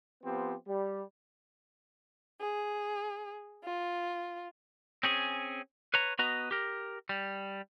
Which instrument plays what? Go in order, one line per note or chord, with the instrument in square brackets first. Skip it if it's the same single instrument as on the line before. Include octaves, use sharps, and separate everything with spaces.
[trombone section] F3 B3 C4 G4
G3
[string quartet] G#4
F4
[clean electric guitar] C4 C#4 G#4
B4 C#5 A#5
B3 F#4 B4 D#5 A#5
G4 A#4
G3